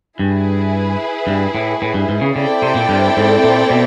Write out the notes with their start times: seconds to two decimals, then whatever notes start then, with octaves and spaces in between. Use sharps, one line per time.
0.19 G2 E4 G#4 B4
1.27 G2
1.55 A2
1.82 A2
1.94 G2
2.09 G#2
2.21 C#3
2.35 C#3 C4 E4 A4 D5 G5
2.62 C3
2.75 A#2
2.89 G2
3.17 G#2
3.44 A#2
3.70 B2